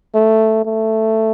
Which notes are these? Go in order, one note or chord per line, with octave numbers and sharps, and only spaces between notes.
A3
A3